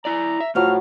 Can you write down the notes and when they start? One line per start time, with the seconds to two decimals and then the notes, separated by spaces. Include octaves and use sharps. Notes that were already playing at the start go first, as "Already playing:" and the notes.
0.05 E4 D5 A#5
0.40 E5
0.55 A2 F3 F#3 F6